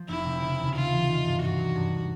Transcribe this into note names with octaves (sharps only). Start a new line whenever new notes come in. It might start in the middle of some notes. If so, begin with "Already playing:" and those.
Already playing: F3
F1 E4
C3
C#3
D#2
D#2 F4
E3
D#3
G2
G2 F#4
F#3
G2